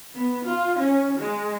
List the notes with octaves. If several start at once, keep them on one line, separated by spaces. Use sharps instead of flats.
B3
F4
C#4
G#3